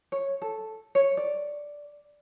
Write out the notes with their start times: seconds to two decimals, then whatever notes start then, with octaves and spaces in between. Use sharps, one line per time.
0.12 C#5
0.42 A4
0.95 C#5
1.17 D5